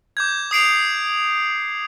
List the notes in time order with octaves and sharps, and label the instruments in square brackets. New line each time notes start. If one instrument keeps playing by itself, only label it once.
[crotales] D6 G6 G#6
D#6 C7 D7 F7